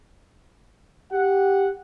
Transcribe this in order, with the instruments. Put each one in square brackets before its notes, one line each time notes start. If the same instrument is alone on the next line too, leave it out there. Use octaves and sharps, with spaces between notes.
[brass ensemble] G4 F#5